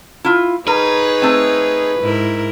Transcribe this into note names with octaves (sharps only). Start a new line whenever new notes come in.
E4 F4
D#4 G#4 A#4 B4 C#5
A3 C4
G#2 E4 A#4